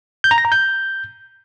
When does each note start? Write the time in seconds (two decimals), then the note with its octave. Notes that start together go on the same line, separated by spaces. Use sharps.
0.24 G6
0.31 A#5
0.38 A#6
0.45 A#5
0.52 G6